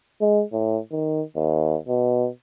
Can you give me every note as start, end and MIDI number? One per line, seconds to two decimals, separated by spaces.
0.21 0.43 56
0.53 0.79 45
0.92 1.22 51
1.36 1.77 39
1.88 2.28 47